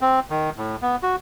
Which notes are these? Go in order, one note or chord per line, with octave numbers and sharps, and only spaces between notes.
C4
D#3
A2
B3
F#4